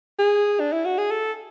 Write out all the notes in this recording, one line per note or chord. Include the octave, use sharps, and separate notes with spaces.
G#4
D4
E4
F#4
G#4
A4